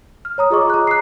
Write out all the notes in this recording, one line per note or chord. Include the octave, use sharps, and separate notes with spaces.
F6
C#5 A#5 D#6
F4 G#4 D#5 C#6 D6
A#5 F#6
F#6 C7